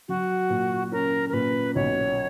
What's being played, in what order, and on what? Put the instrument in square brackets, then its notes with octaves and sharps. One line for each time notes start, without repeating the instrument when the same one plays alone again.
[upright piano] F#3 [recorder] F#4
[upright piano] A#2
[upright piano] C#4 [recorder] A#4
[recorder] A#4
[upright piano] A#2 [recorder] B4
[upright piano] B1 [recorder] C#5